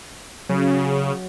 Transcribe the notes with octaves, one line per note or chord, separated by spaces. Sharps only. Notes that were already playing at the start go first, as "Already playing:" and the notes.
C#3 F#3